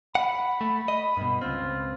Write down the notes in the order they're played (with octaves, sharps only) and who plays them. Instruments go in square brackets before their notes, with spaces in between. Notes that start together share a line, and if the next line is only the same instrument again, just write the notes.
[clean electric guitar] F#5 [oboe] B5
[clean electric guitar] A3
D#5
G2 B2
[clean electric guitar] C#2 C4 [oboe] F4